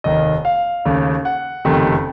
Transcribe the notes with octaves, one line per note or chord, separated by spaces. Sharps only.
F1 D#2 D#3 D#5
F5
D#2 C#3 A3
F#5
F#1 F2 C3 D#3 A3